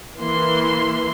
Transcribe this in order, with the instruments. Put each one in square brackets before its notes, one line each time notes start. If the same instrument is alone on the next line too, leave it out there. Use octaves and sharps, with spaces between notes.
[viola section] E3 A#3 C6